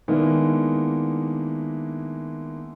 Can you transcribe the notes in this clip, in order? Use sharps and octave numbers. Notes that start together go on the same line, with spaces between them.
D#3 G#3 A#3 B3 D4 E4